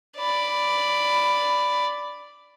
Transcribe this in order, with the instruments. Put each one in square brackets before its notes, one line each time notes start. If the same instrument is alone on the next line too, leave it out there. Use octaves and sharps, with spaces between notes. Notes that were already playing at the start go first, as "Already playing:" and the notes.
[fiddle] D5 B5